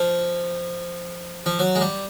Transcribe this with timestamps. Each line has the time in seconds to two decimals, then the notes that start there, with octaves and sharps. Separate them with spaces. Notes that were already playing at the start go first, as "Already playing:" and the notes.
Already playing: F3
1.46 F3
1.59 F#3
1.75 G#3
1.81 G3